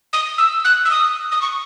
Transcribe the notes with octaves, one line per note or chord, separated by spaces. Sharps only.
D#6
E6
F#6
E6
D#6
D#6
C#6